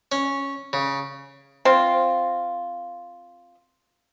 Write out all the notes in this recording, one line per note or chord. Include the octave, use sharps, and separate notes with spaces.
C#4
C#3
C4 F4